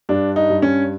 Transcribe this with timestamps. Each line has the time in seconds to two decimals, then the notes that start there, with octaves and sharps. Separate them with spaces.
0.09 G2 D4
0.36 D#4
0.50 G2
0.62 C#4